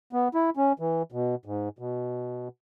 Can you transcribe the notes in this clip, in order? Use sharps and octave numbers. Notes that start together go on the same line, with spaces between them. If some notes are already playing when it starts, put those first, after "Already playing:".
B3
E4
C#4
E3
B2
G#2
B2